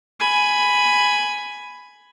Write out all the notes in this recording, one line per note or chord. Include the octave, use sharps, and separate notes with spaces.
G#5 B5